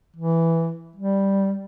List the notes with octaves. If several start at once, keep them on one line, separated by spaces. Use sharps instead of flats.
E3
G3